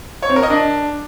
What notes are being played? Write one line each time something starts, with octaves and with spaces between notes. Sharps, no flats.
C#5
C4
A#4
D#5
D4